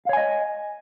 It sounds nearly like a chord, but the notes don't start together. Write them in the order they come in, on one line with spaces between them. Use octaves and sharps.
F5 C#5 G#5 D#5